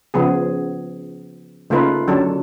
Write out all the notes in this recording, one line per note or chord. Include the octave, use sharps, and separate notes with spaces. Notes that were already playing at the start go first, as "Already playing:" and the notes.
C#3 F3 B3 G#4
C#3 A3 A#3 D#4 F4 B4
D3 F#3 C#4 D4 A4